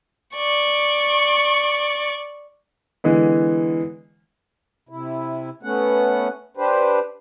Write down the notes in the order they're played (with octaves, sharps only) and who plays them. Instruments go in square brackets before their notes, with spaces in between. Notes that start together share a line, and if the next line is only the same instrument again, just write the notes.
[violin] D5 C#6
[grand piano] D3 E3 G#3 B3
[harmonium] C3 E4
A3 B3 C#4 F#5
D4 G4 B4 C5